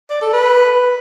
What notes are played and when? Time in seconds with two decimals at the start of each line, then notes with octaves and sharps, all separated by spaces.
0.10 D5
0.21 A4
0.33 B4